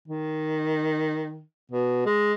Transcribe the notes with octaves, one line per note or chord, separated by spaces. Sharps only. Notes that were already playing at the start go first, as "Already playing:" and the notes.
D#3
B2
G#3